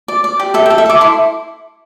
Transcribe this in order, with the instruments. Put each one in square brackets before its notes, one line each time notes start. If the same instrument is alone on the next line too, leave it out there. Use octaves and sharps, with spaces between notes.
[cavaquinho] D5
D5
G4
A4 E5
G5
A4
E5
A4 D6
E4 C6